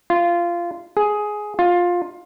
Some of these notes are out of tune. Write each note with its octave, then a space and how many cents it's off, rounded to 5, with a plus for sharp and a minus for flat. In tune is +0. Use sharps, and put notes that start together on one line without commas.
F4 -15
G#4 +10
F4 +15